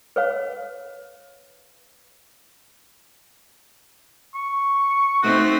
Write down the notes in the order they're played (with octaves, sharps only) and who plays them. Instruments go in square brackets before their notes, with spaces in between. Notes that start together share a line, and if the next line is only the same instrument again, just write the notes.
[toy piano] B4 C#5 F5
[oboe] C#6
[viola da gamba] A3 C4 D#4 [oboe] F#4